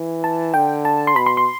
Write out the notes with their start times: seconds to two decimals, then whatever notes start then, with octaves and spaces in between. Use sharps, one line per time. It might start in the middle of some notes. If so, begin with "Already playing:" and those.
Already playing: E3
0.24 A5
0.54 D3 G5
0.85 A5
1.07 C6
1.16 B2 B5
1.26 C6
1.37 C6